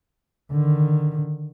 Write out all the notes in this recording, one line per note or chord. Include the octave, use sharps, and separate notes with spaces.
D3 D#3